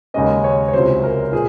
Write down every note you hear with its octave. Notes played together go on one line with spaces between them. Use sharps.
D#2 C#3 G#3 C#4 D#5
C#5
C#5
C#2 C3 F#3 C#4 C5
A#4
A#2 G#4